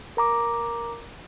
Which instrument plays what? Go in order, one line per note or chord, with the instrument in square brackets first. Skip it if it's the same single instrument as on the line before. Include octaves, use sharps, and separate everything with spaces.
[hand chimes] A#4 A#5 D6